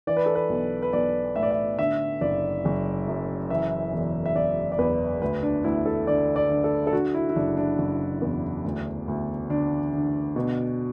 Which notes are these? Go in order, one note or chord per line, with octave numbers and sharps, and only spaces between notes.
E3 D5
B4
A4
B4
B1
B4
B1 D5
A2 E5
D5
E5
D3 E5
F#1 D5
F#1
F#2
E3 E5
E1
E5
E1 D5
D5
E2 B4
D2 B4
D4
D2 E4
A4
D3 D5
D5
D3
A4
A4
D3 F#4
E4
E4
F#1 D4
D4
F#1
E2
D2
D2
D3 D4
D3
B2